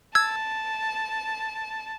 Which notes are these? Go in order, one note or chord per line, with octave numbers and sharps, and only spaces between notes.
A5 E6 G#6